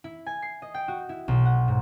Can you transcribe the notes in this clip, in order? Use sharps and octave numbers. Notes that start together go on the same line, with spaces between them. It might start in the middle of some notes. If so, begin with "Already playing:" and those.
E4
G#5
C7
D#5
G5
F#4
E4
B1
F#5
G#2